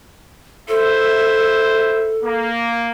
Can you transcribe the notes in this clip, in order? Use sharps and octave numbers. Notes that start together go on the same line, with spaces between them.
E4 A4 C5 E5
A#3